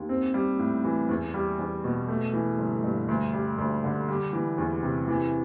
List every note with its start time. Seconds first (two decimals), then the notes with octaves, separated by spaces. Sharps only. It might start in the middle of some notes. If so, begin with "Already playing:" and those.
Already playing: D#2
0.09 C4
0.34 G3
0.59 A2
0.84 E3
1.09 E2
1.34 G3
1.59 E2
1.84 B2
2.09 A3
2.33 E3
2.58 G1
2.84 G2
3.08 D2
3.34 G3
3.58 D2
3.84 D3
4.09 G3
4.33 E3
4.58 E2
4.83 C3
5.08 E3